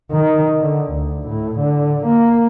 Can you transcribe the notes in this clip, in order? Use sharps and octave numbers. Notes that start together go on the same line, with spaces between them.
D#3
D3
D2
A2
D3
A#3